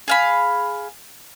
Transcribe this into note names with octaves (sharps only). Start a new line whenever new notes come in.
G#4 F5 B5